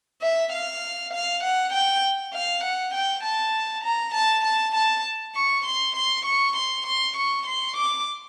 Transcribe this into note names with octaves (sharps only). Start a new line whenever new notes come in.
E5
F5
F5
F#5
G5
F5
F#5
G5
A5
A#5
A5
A5
A5
C#6
C6
C6
C#6
C6
C6
C#6
C6
D6